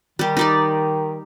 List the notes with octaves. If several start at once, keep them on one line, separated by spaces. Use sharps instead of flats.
D#3 G3 G4
D#4 G4 D5